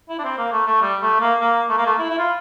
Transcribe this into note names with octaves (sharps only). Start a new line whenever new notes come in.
E4
D4
C4
A#3
A3
A3
G3
A3
A#3
A#3
A3
A#3
A3
E4
E4
F4